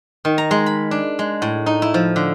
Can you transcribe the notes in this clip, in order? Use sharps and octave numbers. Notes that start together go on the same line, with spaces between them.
D#3
A#5
G#3
B5
D4
G#3
A2
D#4
E4
F3
D3